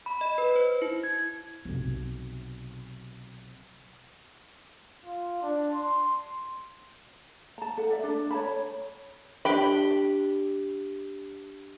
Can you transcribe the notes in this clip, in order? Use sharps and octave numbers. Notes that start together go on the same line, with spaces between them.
B5
D#5
B4
C5
E4
G#6
B1 C3
F4
D4
C6
A5 A#5
A4 F#5
D5 E5
D4 A4
C#5 A5 B5
C#5
D4 G4 B5